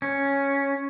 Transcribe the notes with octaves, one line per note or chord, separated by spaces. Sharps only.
C#4